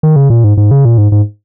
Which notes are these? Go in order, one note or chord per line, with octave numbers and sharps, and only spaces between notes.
D#3
C#3
A#2
G#2
G#2
C#3
A#2
G#2
G#2